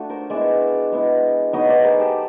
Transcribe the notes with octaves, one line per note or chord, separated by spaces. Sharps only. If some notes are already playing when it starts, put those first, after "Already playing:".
Already playing: A3 D4 F4 F#4
A#4 C5
G#3 B3 E4 D5 E5
G#3 B3 E4
F#3 B3 D#4 C#5 D#5
C5 D5
G#4 A#4
G4 A4